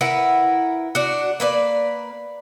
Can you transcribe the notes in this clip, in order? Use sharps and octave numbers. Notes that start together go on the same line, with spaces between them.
E4 A#4 B4 F#5
D4 F#4
A#3 B4 D5